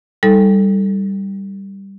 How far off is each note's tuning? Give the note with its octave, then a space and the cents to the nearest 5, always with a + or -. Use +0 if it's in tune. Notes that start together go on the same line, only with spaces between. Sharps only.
G3 +0 D#4 +25 A4 +0